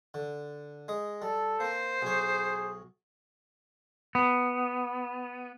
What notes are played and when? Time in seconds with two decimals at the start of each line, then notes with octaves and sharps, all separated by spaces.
0.14 D3
0.88 G#3 D#5
1.22 G3 A4
1.60 A#3 C4 C5
2.02 B1 G#4 C#5
4.15 B3